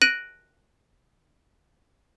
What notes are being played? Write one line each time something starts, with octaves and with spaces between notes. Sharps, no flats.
F#6 A#6 D7 D#7 F#7